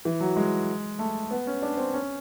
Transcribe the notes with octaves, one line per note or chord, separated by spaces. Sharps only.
E3
F#3
G#3
A3
B3
C#4
D4
C4
C#4